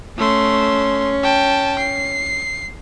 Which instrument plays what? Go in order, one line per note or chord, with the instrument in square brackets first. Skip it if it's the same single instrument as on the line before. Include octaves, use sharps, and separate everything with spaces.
[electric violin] A3 C6 [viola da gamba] C#4
[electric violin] G5 A5
C7